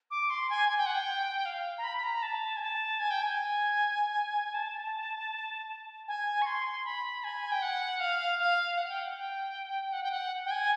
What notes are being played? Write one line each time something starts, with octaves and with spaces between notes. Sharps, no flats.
D6
C6
G#5
G#5
G5
F#5
G5
F5
A#5
B5
B5
A#5
A5
G#5
A5
G#5
G5
G#5
A5
G#5
C#6
C6
B5
G#5
G5
F#5
F5
F5
F#5
G5
F#5
G5
F#5
G5
F#5
G5
G#5